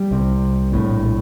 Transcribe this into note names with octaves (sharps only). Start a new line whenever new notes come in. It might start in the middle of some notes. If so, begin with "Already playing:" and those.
Already playing: G3
C2 C3
A#1 A2